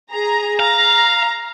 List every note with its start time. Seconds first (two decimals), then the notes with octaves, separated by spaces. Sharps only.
0.11 G#4 A#5
0.60 F5 A#5